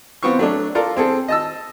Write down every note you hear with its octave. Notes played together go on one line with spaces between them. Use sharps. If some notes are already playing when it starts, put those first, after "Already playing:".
B3 C4 F4 C#6
F#3 A3 D4
F4 A4 A#4 D5
C4 G#4 A4
D#5 A5 E6